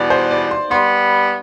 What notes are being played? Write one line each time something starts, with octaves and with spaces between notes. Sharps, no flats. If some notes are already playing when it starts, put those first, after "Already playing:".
Already playing: E2 B2 G3 B3 D5
C5
D5
C6
G3 B3 C6